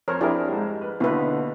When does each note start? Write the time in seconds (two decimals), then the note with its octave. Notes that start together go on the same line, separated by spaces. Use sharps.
0.08 F2 A#4 C5 C#5 F6
0.21 D4 E4 G4 G#4 A#4
0.48 G#2 G3
0.81 B4
1.00 D#2 B2 D3 B3 E4 B4